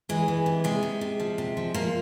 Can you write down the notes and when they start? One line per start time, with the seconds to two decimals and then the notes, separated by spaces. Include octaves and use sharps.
0.09 E3 G#3
0.28 E3
0.46 C3
0.64 C3 G#3
0.83 C3
1.01 C3
1.20 F3
1.38 C3
1.57 F3
1.74 F3 A#3